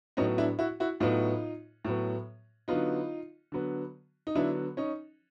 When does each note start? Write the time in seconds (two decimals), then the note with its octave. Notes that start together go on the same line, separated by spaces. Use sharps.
0.17 A2 F#3 B3 C#4 D#4
0.38 D4 E4
0.59 E4 F#4
0.80 E4 F#4
1.00 A2 F#3 B3 D#4 F4
1.85 A2 F#3 B3
2.68 D3 F#3 B3 D#4 F4
3.52 D3 F#3 B3
4.27 D#4
4.35 D3 F#3 B3 D4 E4
4.77 C#4 D#4